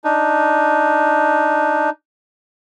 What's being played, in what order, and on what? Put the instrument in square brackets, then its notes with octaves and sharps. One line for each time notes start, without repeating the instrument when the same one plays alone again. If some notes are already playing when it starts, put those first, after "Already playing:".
[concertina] D4 D#4